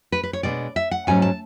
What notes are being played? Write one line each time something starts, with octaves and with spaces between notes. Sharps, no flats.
B4
B4
C#5
B2 G#3 B3 D4 D5
E5
F#5
G#2 F#3 A3 C#4 G#5
A5